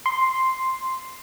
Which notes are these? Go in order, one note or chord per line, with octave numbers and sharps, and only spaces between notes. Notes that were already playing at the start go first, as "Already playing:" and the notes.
C6